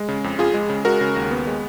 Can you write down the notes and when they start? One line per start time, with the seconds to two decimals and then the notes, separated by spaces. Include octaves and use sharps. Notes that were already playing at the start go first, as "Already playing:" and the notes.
Already playing: G#3
0.09 C#3
0.24 F2
0.39 F2 F4 G#4
0.54 G#3
0.70 C#3
0.85 G#3 F#4 A#4
1.01 C#3
1.16 D#2
1.31 B3
1.47 G#3